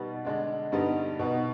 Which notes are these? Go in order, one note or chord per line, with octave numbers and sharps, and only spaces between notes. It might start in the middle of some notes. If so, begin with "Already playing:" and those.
Already playing: B2 G3 B3 D#4
D3 G#3 D4
G2 D3 G3 B3 D#4
B2 B3 D#4